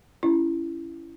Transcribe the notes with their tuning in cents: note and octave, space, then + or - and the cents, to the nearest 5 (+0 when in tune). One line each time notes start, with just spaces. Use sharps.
C#4 +15 E4 +25